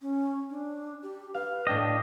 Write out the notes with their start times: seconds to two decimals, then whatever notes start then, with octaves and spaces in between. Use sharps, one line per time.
0.02 C#4
0.50 D4
1.03 G4
1.34 B4 F5
1.67 A2 D4 D#5 G5